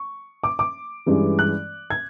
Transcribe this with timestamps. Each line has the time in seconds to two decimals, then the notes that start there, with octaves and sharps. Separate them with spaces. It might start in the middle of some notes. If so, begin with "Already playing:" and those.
Already playing: C#6
0.44 D6
0.59 D6
1.06 G2 E3 G#3 C#4
1.39 F#6
1.90 G#6